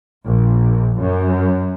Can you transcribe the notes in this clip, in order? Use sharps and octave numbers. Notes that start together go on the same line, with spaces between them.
A#1
F#2